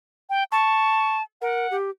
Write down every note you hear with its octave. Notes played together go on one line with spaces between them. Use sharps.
G5
A5 C#6
A#4 F#5
G4